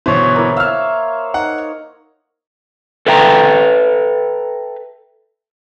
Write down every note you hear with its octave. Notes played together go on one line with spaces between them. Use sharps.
G1 B2 E3 C5 C#5
A#3 E4
E5 F5 E6 F6
D#4 F#5
A4 B4 E5 G5 A5 A#5